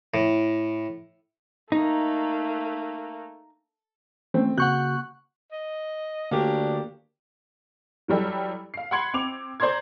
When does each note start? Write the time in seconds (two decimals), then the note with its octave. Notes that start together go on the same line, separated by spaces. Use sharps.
0.14 A2
1.72 A3 A#3 D#4
4.34 E3 A3 C4 C#4
4.58 C#3 A#3 F#4 F#5 C#6 F#6 G6
5.52 D#5
6.31 D2 D3 A#3 C#4 D4 G4
8.08 E3 F#3 G3 A4
8.74 F5 C7
8.91 F#5 B5 C6 G#6 C#7 F#7
9.14 C4 D6 F7
9.60 C5 D5 A#5 C6 G#6